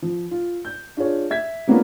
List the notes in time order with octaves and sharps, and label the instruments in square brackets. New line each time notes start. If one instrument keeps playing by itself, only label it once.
[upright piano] F3
F4
G6
D4 F4 G#4 C#5
E5 G#6 B6
G#3 A#3 B3 C#4 D4 F4